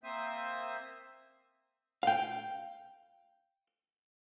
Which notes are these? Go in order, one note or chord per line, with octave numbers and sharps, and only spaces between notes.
A#3 C4 C5 E5 D#6
F5 G5